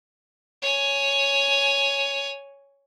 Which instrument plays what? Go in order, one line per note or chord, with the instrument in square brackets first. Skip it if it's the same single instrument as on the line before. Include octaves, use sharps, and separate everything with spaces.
[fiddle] C#5 G#5